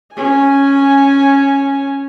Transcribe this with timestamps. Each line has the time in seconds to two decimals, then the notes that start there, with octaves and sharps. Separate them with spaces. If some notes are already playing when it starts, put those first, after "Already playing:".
0.14 C#4 G#5